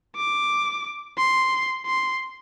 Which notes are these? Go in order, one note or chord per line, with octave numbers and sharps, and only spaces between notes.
D6
C6
C6